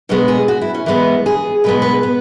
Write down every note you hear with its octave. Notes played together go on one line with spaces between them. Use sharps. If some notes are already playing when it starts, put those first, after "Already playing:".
B2 G#3 B3 C#4
G#4
F#4
E4
C#4
E3 G#3 B3 B4
G#4
B2 G#3 B3 B4
B4
B3